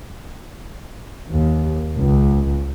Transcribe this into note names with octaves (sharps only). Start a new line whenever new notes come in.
D#2
C#2